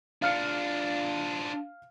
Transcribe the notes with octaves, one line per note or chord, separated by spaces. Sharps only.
D4 F4 F5 F6 C#7